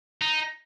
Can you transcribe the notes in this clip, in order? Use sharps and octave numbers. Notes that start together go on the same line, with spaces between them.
D#4